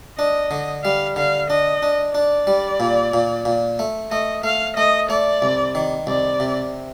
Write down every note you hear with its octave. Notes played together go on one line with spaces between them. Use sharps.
D4 D#5
D3
G3 F5
D3 F5
D4 D#5
D4
D4 D5
G3
A#2
A#2
A#2
A3
A3 D#5
A3 F5
A3 D#5
A3 D5
C2
D#3
C2 D5
C3